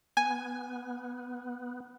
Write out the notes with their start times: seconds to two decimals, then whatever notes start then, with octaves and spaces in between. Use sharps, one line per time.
0.17 B3 G#5